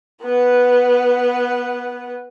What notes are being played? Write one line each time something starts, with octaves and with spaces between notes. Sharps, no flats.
B3 B4